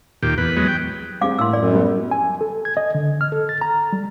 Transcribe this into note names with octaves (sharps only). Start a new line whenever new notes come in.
D#2 A#2 G4
E2 B4
F#3 G#3 B3
G5
G3 C4 G#4 F5 D6
A2 A#3 C6 E6
F#2 D5
G3 B3
G#5
A4
G#6
D#5
D3
F6
A4
A6
A#5
G3